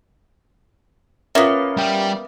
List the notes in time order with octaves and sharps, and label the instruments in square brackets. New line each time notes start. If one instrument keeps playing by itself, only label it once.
[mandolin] A#3 B3 [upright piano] C#4 F4 A#4 [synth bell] E5
[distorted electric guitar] G3 G4